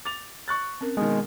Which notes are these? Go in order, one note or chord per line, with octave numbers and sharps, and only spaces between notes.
D6 A6 F7
C#6 F#6 A6
C4 C#4 A#4
B2 D#3 G#3